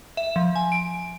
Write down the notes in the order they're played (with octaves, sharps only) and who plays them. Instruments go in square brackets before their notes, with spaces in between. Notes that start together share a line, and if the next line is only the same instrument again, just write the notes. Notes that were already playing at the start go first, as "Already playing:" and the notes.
[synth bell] E5
F3
G#5
D7